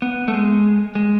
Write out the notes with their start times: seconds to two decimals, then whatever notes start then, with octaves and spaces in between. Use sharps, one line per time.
0.02 B3
0.28 A3
0.34 G#3
0.95 G#3